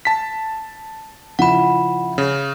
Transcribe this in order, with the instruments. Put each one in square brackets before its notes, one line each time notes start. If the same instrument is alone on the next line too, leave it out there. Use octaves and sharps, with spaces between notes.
[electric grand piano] A5 B6
[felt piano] C#3 F3 E4 [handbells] F#5 B5
[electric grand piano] C#3